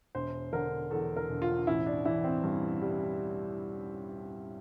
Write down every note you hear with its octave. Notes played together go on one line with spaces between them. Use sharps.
E1 C5
D3 A#4
E2 A4
A#4
E1
F4
A1 E4
D4
E3 E4
C4
G2
G3